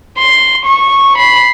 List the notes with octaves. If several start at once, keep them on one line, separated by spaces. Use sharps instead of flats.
C6
C#6
B5 C7